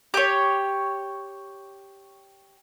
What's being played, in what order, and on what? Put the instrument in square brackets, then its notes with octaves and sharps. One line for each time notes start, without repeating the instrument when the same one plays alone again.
[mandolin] G4 C#5